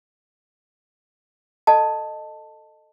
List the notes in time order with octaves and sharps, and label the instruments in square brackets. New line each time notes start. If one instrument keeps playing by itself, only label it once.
[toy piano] A4 D#5 A5